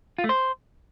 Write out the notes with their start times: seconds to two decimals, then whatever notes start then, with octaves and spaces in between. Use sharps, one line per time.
0.18 F4
0.24 A3
0.29 C5